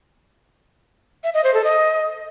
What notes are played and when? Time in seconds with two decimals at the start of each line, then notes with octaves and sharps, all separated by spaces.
1.24 E5
1.34 D#5
1.44 C5
1.54 A4
1.64 D#5